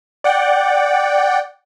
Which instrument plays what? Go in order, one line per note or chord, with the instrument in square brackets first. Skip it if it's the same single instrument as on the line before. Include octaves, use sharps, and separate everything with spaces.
[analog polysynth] D5 F#5 G5